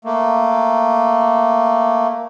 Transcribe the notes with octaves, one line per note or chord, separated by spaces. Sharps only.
A3 A#3